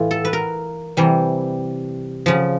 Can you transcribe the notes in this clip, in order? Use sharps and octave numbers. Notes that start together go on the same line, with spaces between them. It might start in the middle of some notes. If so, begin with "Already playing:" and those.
Already playing: A2 E3 F4
A4
B4
A#4
C3 E3 G3
C#3 F3